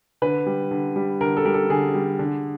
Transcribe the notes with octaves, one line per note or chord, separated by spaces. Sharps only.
D3 B4
G3
D3
G3
D3 A#4
A4
G3 A#4
A4
D3 G#4
G3
D3